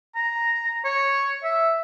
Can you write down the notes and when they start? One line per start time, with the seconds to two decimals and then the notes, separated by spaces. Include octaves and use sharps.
0.15 A#5
0.85 C#5
1.44 E5